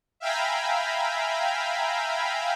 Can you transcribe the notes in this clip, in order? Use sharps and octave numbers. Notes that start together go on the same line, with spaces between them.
E5 F5 G5 G#5 A#5 B5